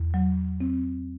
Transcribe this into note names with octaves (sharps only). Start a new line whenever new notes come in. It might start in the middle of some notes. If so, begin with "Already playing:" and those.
Already playing: E2
F#3
C4